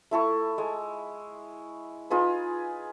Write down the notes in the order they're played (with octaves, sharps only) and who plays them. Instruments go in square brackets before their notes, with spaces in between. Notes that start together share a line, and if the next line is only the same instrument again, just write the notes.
[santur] A3 E4 A4 C#6
G#3
D#4 F4 G#4 B4